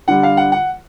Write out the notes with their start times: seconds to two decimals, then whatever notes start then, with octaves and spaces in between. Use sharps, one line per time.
0.08 D3 G3 F#5
0.23 F5
0.37 F#5
0.52 F#5